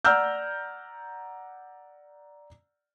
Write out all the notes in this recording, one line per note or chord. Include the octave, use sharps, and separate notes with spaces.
D5 F#5 A#5 E6 F6 G6